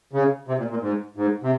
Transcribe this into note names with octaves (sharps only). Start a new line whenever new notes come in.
C#3
C3
A#2
A#2
G#2
G#2
C3